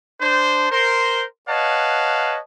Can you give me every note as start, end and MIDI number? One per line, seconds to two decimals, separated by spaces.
0.21 0.71 62
0.21 0.71 72
0.72 1.24 70
0.72 1.24 72
0.72 1.24 84
1.48 2.39 71
1.48 2.39 73
1.48 2.39 75
1.48 2.39 77
1.48 2.39 78
1.48 2.39 81